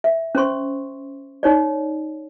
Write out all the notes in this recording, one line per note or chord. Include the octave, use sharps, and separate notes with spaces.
E5
C#4 C5 C6 C#6
D#4 C#5 D5